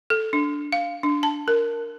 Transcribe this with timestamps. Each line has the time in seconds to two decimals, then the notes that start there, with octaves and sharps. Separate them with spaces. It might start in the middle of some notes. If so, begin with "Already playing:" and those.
0.10 A4
0.33 D4
0.72 F5
1.03 D4
1.23 A5
1.48 A#4